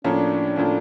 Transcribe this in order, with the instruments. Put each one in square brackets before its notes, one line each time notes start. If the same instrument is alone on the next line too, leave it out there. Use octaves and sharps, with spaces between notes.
[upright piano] A2 F3 A#3 C#4 [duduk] D4
[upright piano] A2 F3 A#3 C#4